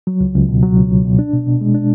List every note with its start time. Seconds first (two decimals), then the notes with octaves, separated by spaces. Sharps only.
0.07 F#3
0.21 C#2
0.34 C#2
0.49 B2
0.63 F#3
0.76 C#2
0.91 C#2
1.05 B2
1.19 D4
1.33 B2
1.47 B2
1.61 G#3
1.75 D4